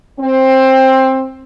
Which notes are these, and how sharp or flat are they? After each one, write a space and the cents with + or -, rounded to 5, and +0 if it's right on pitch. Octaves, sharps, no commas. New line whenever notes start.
C4 +15